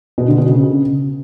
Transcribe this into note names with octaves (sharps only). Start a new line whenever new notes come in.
B2
D3
B2
C#3